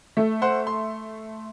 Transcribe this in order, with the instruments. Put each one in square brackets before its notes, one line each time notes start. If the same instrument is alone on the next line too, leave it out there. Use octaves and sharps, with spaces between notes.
[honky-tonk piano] A3
[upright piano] C5 F#5 C6
C6